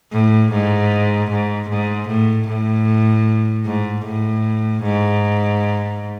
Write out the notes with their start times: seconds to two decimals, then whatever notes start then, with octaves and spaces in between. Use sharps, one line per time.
0.13 A2
0.52 G#2
1.31 G#2
1.69 G#2
2.09 A2
2.48 A2
3.66 G#2
4.05 A2
4.83 G#2